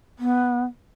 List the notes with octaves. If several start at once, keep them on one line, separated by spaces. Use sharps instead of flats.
B3